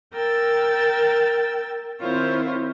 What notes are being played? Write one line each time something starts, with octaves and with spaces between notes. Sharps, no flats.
A#4 G5 E6 A6
D#3 C4 E4 F4 C5 C#5